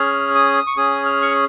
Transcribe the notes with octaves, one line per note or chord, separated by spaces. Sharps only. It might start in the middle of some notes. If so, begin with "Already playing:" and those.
Already playing: C#4 G#4 F6
D#6
C#6
C#4 G#4 D#6
F6
C#6